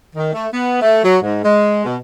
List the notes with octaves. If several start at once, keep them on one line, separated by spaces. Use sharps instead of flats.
D#3
A3
B3
A3
F#3
G#2
G#3
B2